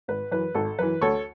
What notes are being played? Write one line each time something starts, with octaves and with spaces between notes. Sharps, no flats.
G#1 B4
F#2 E3 B4
G#1 A4
F#2 E3 B4
D2 A4 C#5